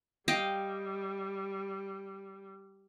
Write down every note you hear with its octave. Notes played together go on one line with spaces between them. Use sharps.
G3 D#5 F5 G5